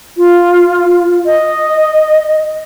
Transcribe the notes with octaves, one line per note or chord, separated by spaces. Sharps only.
F4
D#5